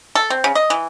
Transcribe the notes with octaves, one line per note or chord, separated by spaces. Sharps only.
A4
C4
C#3
D#5
E3